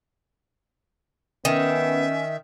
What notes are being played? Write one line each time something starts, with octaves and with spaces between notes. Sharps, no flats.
D#3 B3 C#4 E5